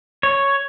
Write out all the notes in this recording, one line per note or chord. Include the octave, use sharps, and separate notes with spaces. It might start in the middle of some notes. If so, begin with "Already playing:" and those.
C#5